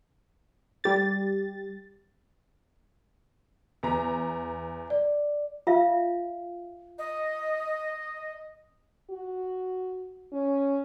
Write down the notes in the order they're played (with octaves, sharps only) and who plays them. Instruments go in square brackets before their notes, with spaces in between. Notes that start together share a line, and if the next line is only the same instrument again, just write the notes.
[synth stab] G3 G4 A6
[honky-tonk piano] E2 A#5
[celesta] D5
[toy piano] F4 E5 F5
[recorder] D#5
[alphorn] F#4
C#4